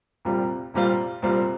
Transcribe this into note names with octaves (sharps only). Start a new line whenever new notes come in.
C2 A#2 G3 C4 F4
C2 A#2 G3 C4 F4
C2 A#2 G3 C4 F4